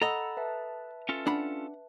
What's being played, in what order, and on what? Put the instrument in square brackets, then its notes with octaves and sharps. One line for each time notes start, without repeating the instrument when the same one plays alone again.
[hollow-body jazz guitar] A4 D#5 [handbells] F#5 B5 E6 [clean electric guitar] A#5
[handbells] B4 E5 A5
[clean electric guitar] C#4 F4 A4
[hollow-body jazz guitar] D4 F#5 B5